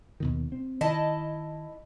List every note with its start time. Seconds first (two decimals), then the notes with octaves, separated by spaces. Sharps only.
0.20 D#2 B2 D#3
0.52 C4
0.81 D#3 E4 D#5 A5